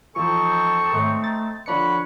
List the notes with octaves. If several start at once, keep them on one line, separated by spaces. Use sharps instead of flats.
E2 F3 C4 D#4 A4 C#6
G#1 A3 C#5
A6
D3 F3 D4 B4 C#5 B5 C#7